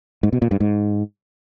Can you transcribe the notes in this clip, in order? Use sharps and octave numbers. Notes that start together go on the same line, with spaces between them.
G#2
B2
A#2
G2
G#2